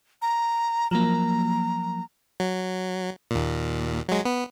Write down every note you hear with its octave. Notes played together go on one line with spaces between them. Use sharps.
A#5
F3 F#3 A#3 A#5
F#3
D#2 A#2
F#3 G#3
B3